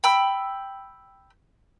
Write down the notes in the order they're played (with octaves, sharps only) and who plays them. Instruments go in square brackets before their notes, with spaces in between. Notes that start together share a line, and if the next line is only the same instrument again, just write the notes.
[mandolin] G5 B5 E6